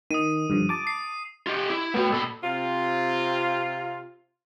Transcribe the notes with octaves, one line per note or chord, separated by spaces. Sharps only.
D#3 D#6 D#7
G2 D3 F3
A5 D6
C7
F4 G4
E4
A3 B3 F#4 G5
A#2 A4 B5
C3 C4 F4